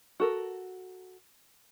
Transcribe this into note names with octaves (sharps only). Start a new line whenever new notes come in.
F#4 A4 A#4